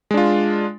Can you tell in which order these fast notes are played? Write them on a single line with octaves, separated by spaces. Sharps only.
G#3 D4 F4